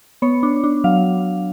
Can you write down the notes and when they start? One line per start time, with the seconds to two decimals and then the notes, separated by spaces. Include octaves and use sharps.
0.22 B3 C#5
0.43 D4
0.64 D4
0.84 F#3 F5